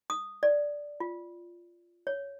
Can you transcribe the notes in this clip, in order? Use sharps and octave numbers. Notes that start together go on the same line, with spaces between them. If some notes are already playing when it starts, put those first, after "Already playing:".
D#6
D5
F4
C#5